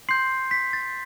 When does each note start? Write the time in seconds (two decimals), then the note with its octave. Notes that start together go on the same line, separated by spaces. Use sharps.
0.09 C6 G6 C7
0.51 B6
0.73 A6